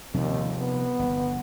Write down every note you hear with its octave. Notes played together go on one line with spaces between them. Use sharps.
D#2 C3 F3 G3
B3
G1